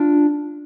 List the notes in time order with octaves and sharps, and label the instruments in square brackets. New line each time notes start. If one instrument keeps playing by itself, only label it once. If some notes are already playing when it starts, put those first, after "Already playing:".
Already playing: [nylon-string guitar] D4 F4